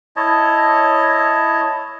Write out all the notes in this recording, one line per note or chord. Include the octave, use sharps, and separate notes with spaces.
E4 C#5 D#5 A5